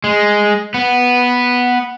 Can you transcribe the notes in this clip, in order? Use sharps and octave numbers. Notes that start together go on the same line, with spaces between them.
G#3
B3